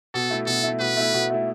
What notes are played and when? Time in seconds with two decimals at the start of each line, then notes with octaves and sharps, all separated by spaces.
0.14 B2 A4
0.30 A3 E4
0.46 B2 A4
0.63 A3 E4
0.80 B2 B4
0.97 A3 E4
1.14 B2
1.30 A3 E4